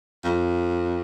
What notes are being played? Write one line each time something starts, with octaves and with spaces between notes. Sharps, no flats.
F2